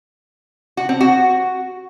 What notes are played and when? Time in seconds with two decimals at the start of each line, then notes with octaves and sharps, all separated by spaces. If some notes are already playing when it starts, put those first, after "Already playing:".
0.77 F#4
0.89 C4
1.01 F#4